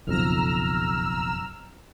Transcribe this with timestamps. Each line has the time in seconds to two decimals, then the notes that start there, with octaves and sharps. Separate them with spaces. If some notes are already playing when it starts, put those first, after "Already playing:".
0.07 F#1 B1 F2 A#5 E6 F6